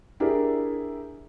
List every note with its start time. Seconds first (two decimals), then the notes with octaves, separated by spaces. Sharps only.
0.20 D4 E4 G4 G#4 A#4